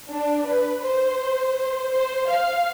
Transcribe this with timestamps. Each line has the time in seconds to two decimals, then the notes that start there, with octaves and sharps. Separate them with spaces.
0.10 D4
0.47 B4
0.83 C5
1.92 C5
2.29 F5